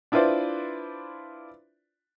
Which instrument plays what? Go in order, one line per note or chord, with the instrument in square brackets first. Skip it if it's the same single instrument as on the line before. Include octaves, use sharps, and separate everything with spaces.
[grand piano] D4 E4 F4 B4 C5 D5